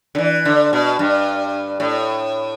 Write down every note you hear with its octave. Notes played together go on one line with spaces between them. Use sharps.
D3
E3
D3
B2
G2
A2